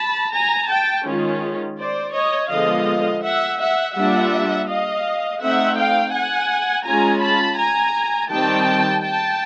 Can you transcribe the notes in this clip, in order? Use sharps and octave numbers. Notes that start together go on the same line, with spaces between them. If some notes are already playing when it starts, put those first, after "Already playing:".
Already playing: A5 B5
G#5 A#5
G5 A5
D#3 G#3 C#4 F4
C5 D5
C#5 D#5
D3 F3 G#3 B3 D#5 F5
E5 F#5
E5 F#5
G3 A#3 D4 F4 E5 F#5
D#5 F5
A3 C4 D#4 E5 F#5
F5 G5
F#5 G#5
G#3 C#4 F4 G#5 A#5
A5 B5
G#5 A#5
D#3 G3 C4 G5 A5
G5 A5